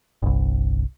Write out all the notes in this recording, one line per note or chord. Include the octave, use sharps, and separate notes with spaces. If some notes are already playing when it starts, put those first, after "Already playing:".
G1 C2